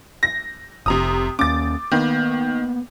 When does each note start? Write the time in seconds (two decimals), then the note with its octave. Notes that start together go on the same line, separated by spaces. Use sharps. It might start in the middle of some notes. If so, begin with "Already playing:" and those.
0.23 A#6
0.86 F1 C3 A#5 D#6
1.39 D#2 A#3 C#4 D6 A6
1.91 D#3 A#3 B3